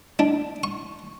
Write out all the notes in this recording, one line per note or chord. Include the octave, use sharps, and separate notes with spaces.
D4
C#6